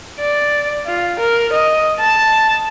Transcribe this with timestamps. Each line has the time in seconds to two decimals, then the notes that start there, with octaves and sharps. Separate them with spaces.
0.20 D5
0.86 F4
1.20 A#4
1.53 D#5
2.00 A5